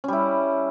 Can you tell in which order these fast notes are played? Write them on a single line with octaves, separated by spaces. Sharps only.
C#4 G3 E4